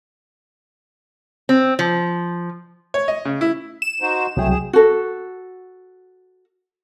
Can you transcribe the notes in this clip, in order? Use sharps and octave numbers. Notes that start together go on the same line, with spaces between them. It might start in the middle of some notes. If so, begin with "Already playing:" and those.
C4
F3
C#5
D#5
C#3
E4
E7
D#4 F#4 C5
C2 F#3 A3 G#4 G5
G#4
F#4 A4